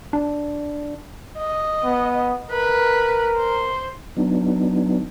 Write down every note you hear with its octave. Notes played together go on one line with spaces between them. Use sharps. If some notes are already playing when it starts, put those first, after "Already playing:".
D4
D#5
B3
A#4 B4
C5
F#3 B3 D4 D#4